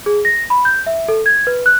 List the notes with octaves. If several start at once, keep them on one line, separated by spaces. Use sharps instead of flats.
G#4
A#6
B5
G6
E5
A4
G#6
B4
F#6